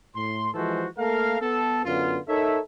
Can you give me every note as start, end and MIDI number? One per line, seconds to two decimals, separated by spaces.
0.16 0.49 45
0.16 0.49 84
0.54 0.85 52
0.54 0.85 53
0.54 0.85 56
0.54 0.85 66
0.54 0.85 69
0.54 0.85 72
0.98 1.38 57
0.98 1.38 58
0.98 1.38 69
0.98 1.38 70
0.98 1.38 77
1.41 1.83 59
1.41 1.83 69
1.85 2.18 42
1.85 2.18 50
1.85 2.18 59
1.85 2.18 65
2.28 2.57 63
2.28 2.57 69
2.28 2.57 70
2.28 2.57 73
2.28 2.57 76